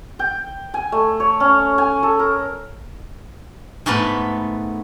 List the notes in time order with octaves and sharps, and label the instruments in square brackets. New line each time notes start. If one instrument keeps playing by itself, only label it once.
[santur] G5
G#5
A3
C#5
C#4
G#5
A4
A#4
[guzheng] G#2 A3 B3 B4